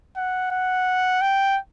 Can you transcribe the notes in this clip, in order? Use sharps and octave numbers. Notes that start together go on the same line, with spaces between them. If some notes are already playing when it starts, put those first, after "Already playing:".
F#5
F#5
G5